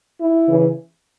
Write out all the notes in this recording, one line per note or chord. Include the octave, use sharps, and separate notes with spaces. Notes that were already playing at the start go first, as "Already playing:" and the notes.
E4
C#3 E3